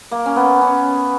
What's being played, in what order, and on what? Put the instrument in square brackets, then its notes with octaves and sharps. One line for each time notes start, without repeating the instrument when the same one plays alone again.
[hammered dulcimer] A#3
C#4
B3
C#4